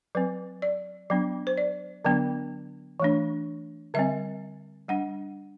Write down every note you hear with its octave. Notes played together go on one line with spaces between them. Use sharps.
F#3 C4 B4
D5
F#3 B3 D4
C5
D5
D3 F#3 B3 D4
E3 A3 D4
D3 G3 C4 E5
G3 D4 F#5